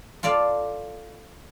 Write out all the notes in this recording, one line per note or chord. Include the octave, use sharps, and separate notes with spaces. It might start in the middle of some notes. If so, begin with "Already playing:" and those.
F4 A4 D5 F5